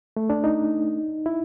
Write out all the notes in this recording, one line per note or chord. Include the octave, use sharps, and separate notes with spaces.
A3
D4
D#4
E4